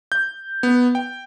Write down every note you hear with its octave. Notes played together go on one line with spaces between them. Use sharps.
G6
B3
G5